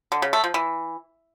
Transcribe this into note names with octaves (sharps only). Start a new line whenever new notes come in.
D3
C#3
A3
F3
E3